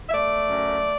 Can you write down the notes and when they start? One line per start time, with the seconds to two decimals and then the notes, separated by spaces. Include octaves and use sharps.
0.09 E5
0.14 A3 D5
0.49 F#2